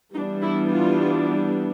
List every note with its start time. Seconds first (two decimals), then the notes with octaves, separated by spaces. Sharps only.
0.14 E3 G3 B3 D4 D#4
0.43 E4
0.70 F4